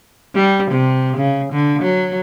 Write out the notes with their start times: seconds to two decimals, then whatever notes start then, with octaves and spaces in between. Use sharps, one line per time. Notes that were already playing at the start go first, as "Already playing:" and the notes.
0.35 G3
0.71 C3
1.17 C#3
1.53 D3
1.82 F#3